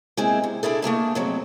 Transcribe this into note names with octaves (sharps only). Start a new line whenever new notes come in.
G#3 A#3 C4 E4 G#4
C3
D4 E4 G#4 A4
A3 A#3 G#4 A5
F2 F#3 C4